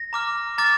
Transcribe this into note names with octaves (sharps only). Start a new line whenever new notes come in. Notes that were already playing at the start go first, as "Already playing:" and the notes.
Already playing: A#6
A#5 D6 F6
A#5 D6 F6 A6